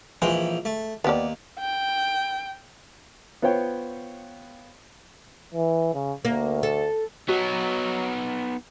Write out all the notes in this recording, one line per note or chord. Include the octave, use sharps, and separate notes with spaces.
A#1 E3 G#3 G5
A3
D#2 B3 G4 D5
G5
B3 F4 C5 C#5 G5
E3
C#3
D2 A#3
A4
F#3 B3 D#4 F#4